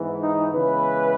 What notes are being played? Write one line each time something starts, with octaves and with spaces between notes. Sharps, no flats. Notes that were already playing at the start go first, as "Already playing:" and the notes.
Already playing: G#2 E3 B3
D#4
C#3 E3 G#3 B3 B4